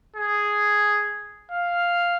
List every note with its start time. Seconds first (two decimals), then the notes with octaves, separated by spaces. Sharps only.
0.16 G#4
1.51 F5